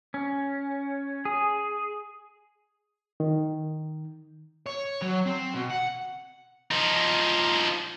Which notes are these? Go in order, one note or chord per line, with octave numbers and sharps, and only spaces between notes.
C#4
G#4
D#3
C#5
F#3
C4
B2
F#5
F3 D#4